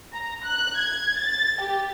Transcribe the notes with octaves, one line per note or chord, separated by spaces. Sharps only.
A#5
F#6
G#6
A6
G4